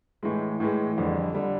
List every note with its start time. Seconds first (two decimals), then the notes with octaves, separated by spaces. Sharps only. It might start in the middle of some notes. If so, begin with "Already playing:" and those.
0.23 A2 E3 G#3
0.60 A2 E3 G#3
0.97 F2 D3 G3
1.35 D3 G3